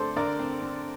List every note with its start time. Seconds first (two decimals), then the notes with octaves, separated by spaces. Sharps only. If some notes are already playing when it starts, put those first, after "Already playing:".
Already playing: D3 A3 C4 A4 C5 D5
0.16 D3 A#4 D5
0.39 C4
0.62 D3